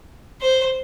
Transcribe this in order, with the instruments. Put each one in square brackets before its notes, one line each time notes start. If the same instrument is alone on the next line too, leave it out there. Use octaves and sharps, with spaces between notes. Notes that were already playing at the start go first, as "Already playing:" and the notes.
[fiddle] C5